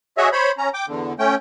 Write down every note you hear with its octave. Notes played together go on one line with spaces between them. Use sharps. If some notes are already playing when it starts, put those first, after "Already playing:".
F#4 G#4 C#5 D#5 E5
C5 C#5 B5
C#4 A#5
G5 D6
E2 D3
A3 C#4 G5